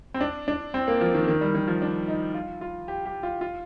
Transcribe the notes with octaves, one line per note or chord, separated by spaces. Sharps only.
C4
D4
D4
C4
A#3
F3
D#3
D#3
G3
D#3
F3
D4
D#4
F4
F4
G4
G4
F4
F4